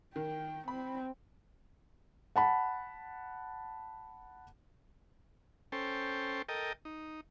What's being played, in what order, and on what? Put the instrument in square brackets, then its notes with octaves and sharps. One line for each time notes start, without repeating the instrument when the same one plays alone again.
[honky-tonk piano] D#3 [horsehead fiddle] G5
[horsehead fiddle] C4 [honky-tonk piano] B5
[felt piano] F#5 A5 B5
[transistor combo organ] C#4 A4 C5 G5
A4 A#4 D#5 G5
D#4